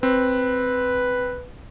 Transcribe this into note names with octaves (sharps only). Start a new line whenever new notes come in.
C4 B4